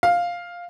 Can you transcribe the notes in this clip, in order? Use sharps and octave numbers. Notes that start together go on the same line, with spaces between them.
F5